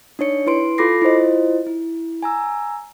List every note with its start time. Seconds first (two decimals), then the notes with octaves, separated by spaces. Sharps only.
0.19 D4 D#4 C#5 C#7
0.47 E4 B4 C6 D7
0.78 F4 A4 B5 D6 A#6 C7
1.02 E4 F4 C5 D#5
1.67 E4
2.22 G#5 A#5 E6